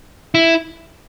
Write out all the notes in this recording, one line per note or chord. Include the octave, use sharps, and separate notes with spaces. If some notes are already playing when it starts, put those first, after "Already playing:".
E4